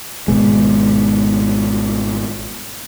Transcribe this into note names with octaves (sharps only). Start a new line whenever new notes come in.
G#1 B2 G#3